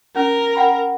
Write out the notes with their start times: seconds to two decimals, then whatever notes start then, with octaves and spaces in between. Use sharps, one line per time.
0.16 C#4 A#4 G#5
0.56 F#5 G5 B5